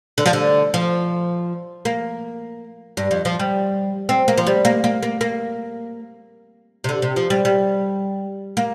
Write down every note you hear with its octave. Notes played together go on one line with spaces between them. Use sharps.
D3
F3
D3
F3
A#3
G2
F2
F3
G3
C4
A#3
F3
G3
A#3
A#3
A#3
A#3
C3
D3
C3
F3
G3
G3
A#3